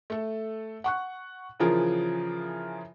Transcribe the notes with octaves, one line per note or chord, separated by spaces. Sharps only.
A3 A4
F#5 C#6 F#6
C#3 E3 F3 F4 G#4 A#4